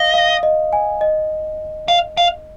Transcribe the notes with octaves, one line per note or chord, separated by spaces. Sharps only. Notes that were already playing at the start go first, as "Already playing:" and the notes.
Already playing: D#5 F5 D#6
F5
D#5
G#5
D#5
F5
F5